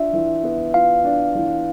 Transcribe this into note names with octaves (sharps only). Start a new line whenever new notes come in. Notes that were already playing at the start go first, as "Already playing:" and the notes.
Already playing: D4 F4 E5
E3
B3
F4 F5
D4
E3